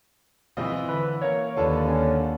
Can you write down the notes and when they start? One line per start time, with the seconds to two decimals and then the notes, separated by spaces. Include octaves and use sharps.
0.57 E3 C4 F4 D#5
0.89 D3 B4
1.21 A#3 C#4 A#4 C#5
1.56 D#2 D3 F4 A4 B4
1.88 C#4